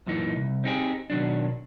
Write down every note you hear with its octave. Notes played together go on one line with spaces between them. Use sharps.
F#2 A#2 E3 D#4
C2
C4 D#4 G4 G#4
B2 D#3 F#3 D4